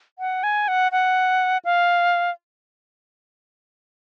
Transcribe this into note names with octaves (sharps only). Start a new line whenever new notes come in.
F#5
G#5
F#5
F#5
F5